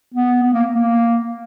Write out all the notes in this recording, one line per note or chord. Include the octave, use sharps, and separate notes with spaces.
B3
B3
A#3
A#3